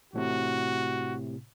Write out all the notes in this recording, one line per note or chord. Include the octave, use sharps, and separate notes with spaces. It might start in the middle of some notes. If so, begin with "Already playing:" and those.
A1 A2 C3 F#4